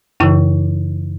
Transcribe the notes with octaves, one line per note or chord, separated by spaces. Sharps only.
F#2 C#3 E3 E4